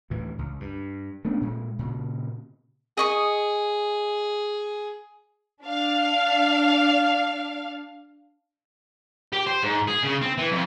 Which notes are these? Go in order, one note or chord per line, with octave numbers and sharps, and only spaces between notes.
D2 A2 E3
C#2
G2
A3 B3 C#4 D4
A#2 G#3
A#2 C#3
G#4 D#5 C#6 D#6
D4 F5
G4
C5
G#2
G#4
C#3
C4
E3
F2